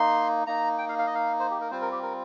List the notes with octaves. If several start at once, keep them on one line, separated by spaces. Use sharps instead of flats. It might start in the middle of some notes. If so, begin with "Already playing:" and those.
Already playing: A#3 D#4 C6
A#3 D#4 A#5
G5
F5
F5
D#5
F5
C5
G4
A#4
G3 C4 F4 C5
A#4
G4
A#4